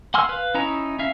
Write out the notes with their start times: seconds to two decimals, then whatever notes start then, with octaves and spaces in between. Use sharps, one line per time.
0.14 F#5 G#5 C6 E6 F6
0.29 B4 F5
0.54 C#4 D#4 E4 A#5
0.99 C#4 E5 F5